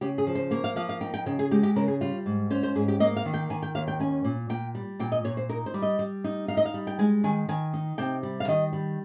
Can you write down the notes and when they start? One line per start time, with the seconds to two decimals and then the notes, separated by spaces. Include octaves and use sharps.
0.01 C#3 G4
0.18 G#4
0.27 F3
0.35 C5
0.51 A#3 C#5
0.64 F5
0.76 F3 F5
0.89 F5
1.01 D#4 G5
1.14 G5
1.26 C#3 G5
1.39 G#4
1.51 G#3 G4
1.63 G4
1.76 C#3 A#4
1.88 G#4
2.01 G3 F4
2.26 G#2
2.50 C#4 C5
2.63 C5
2.76 G#2 G#4
2.88 G4
3.00 A#3 D#5
3.16 F5
3.25 D#3
3.34 G5
3.50 D#3 G#5
3.62 G5
3.75 D#2 F5
3.88 G5
3.99 C#4 G#5
4.24 A#2
4.49 A#2 G5
4.75 G3
5.00 A#2 G5
5.12 D#5
5.24 A#2 C#5
5.37 C5
5.49 D#4 A#4
5.66 C5
5.74 G3
5.82 D#5
5.99 G3
6.24 D#4
6.48 D#4 F5
6.57 D#5
6.65 F5
6.74 G3
6.87 G5
6.99 G#3 G#5
7.24 D#3 G#5
7.49 D#3 G#5
7.74 D#4
7.98 C3 G5
8.23 G3
8.40 F5
8.48 D#3 D#5
8.73 G3